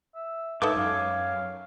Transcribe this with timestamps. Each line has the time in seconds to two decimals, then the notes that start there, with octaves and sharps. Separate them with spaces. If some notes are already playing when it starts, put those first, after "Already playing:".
0.15 E5
0.62 G#2 D#4 A4 B4 C#5 E5 D6
0.76 F#2 F5